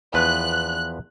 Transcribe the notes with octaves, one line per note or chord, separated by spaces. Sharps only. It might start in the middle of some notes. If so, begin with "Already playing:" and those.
E2 F3 B4 F#6